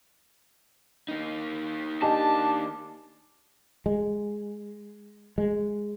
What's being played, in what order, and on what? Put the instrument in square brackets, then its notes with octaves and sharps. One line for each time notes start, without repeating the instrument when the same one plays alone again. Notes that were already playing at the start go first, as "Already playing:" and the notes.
[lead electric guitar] A#3 D#4
[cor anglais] D4 [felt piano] G4 D#5 G#5 [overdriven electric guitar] A5
[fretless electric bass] G#3
G#3